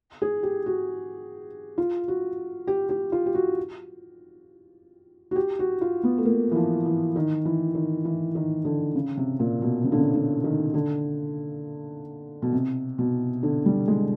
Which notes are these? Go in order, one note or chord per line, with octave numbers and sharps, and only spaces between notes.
G#4
G4
F#4
F4
F#4
G4
G4
F4
G4
F#4
F#4
G4
F#4
F4
B3
A3
A#3
E3
F3
E3
D#3
E3
D#3
E3
D#3
D3
C#3
C3
A#2
B2
C#3
D3
C#3
D3
D#3
D3
B2
C3
B2
D3
G3
G#3